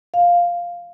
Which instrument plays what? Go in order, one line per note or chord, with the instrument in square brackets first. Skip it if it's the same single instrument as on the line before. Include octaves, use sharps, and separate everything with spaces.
[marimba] F5